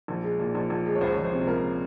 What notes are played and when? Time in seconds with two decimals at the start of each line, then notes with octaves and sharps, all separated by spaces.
0.08 A#1
0.23 G#3
0.39 A#2
0.55 A#1
0.70 A#1
0.85 G#3
0.95 C#5
1.01 C#2 C5
1.12 C#5
1.17 F3
1.25 C5
1.33 C3
1.47 C#2 A#4